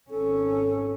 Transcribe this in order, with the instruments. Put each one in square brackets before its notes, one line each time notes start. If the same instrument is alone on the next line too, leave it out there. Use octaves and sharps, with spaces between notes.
[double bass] G#1 C#4 [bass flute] A4